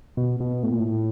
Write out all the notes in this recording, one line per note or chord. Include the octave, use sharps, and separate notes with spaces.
B2
B2
A2
A#2
A2